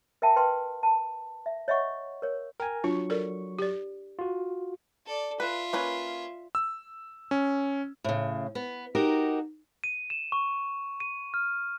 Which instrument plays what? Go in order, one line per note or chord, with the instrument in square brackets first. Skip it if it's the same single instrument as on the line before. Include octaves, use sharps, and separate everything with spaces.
[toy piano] A#4 E5 G5 A5
B4 G5 A5 C6
A5
E5
C#5 D#5 E5 F#5 C#6
A#4 C#5
[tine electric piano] A#4 G#5 [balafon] G5
[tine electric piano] F#3 C#6 [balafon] D4 F4
[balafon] A4 A#4 D5
G4 D5
[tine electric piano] F4 F#4
[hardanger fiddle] A4 D5
[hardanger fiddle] F4 E5 [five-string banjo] B4
[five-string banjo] A#3 C#4 B4
[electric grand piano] E6
C#4
[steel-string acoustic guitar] A2 C#3
B3
D#4 F#4 G4 A#4
[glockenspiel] D#7
E7
C#6
D#7
F6